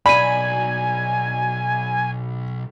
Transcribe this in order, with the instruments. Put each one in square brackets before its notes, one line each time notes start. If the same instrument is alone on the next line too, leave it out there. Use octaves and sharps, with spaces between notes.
[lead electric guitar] B1 [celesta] D5 D#7 [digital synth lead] G#5 [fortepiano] B5